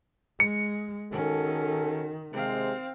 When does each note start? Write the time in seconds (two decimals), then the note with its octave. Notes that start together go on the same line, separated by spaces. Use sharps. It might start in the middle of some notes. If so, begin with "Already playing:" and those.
0.40 G#3 C#7
1.12 D#3 C#4 F#4 G#4 A4
2.33 C3 G#3 C4 F5